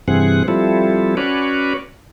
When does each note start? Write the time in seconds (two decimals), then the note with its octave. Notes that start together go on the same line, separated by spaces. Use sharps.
0.08 G2 C3 E3 C4 G#4 F#5
0.48 F3 G3 C4 E4 A4
1.17 C#4 F#4 B4 C#5 D5